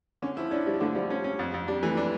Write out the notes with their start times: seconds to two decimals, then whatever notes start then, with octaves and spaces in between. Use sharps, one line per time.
0.22 D3 C#4
0.37 F3 E4
0.51 C#4 D4
0.66 F3 G3
0.80 D3 A3
0.95 F3 G3
1.10 C#4
1.24 C#4
1.39 F2
1.54 F2
1.68 G3 D4
1.82 E3 A3
1.97 D4